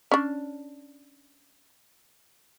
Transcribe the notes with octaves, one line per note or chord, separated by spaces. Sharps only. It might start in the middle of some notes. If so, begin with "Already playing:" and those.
C#4 D4